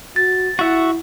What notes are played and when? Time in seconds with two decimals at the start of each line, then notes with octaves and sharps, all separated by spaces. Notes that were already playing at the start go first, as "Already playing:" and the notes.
0.16 F#4 A6
0.59 E4 F#4 E5 F#5